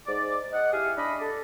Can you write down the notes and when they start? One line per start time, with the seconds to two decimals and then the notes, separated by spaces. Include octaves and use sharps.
0.06 G#2 D5
0.52 D#5 F#5
0.73 E4 G4 G#4 F5
0.97 D4 D5 D#5 B5
1.20 A4 D5